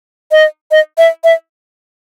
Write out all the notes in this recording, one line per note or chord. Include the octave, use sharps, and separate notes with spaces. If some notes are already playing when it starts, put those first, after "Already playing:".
D#5
D#5
E5
E5